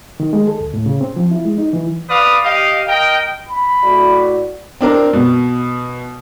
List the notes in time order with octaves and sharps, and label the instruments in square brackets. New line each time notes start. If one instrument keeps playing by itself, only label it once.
[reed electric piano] D#3
G#3
A4
D2
A2
C#3
C4
F3
E4
G#3
D#4
E3
[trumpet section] B4 D5 F5 D#6
G4 D#5 F5
A#4 D#5 G5
[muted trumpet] B5
[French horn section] A2 F#4 D5
[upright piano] C4 D4 A#4
B2